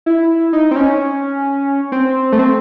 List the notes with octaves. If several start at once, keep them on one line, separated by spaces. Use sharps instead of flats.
E4
D#4
C4
C#4
C4
A3
C4